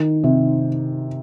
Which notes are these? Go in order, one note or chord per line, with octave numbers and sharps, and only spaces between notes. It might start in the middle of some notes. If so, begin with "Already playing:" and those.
Already playing: D#3
C3